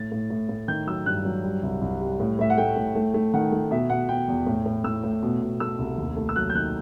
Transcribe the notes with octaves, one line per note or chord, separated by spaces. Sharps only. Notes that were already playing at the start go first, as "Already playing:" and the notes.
Already playing: A2 A6
A2
A2
A2
D#3 G6
F#3 E6
G2 F#6
F#3
G3
C2
C2
G3
A2
A2 E5
F#5
A3 G5
A2
A3
A3
D#3 F#5
A3
B2 E5
B2 F#5
B2 G5
E2
A2
A2
A2 E6
A2
B2
B2
A3 E6
C2
D#2
A3
E6
F#3 F#6
G6
D#3 F#6